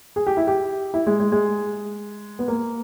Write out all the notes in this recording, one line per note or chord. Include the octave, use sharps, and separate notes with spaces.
G#4
G4
E4
G4
E4
G#3
G#3
G#3
B3
A#3